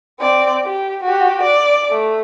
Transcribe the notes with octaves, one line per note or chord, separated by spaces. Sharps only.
C4 D5
G4
F#4 G4
D5
A3